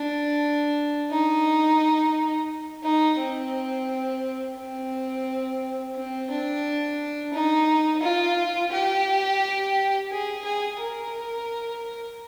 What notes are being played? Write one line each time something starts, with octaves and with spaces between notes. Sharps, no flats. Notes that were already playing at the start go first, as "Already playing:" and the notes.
Already playing: D4
D#4
D#4
C4
C4
C4
D4
D#4
F4
G4
G#4
G#4
A#4